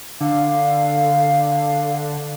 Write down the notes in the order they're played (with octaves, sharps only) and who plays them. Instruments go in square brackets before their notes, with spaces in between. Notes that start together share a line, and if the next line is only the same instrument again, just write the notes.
[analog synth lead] D3 [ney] F5